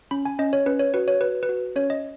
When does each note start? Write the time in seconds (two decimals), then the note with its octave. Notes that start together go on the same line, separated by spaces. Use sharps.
0.11 C#4 B5
0.25 G#5
0.39 C#4 D#5
0.53 C#5
0.66 C#4 B4
0.79 C#5
0.94 F#4 B4
1.08 C#5
1.21 F#4 B4
1.43 B4
1.49 F#4
1.76 C#4 C#5
1.90 D#5